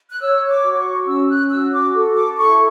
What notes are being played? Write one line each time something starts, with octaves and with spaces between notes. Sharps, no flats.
F#6
C#5 E6
D6
F#4
C#6
C#4 E6
F#6
F#4 E6
D6
A4
D6
E4 C#6